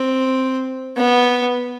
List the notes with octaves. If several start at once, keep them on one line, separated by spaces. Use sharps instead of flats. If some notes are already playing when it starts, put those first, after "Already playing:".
Already playing: C4
B3